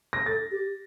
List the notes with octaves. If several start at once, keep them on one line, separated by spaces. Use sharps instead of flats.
A#6
A4 A6
G4